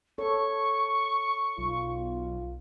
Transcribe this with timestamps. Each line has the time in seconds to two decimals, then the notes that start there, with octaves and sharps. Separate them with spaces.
0.18 A4 C#5 C#6
1.58 B1 F4